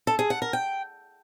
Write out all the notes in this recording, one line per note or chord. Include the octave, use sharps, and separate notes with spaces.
A4
G#4
F#5
A#4
G5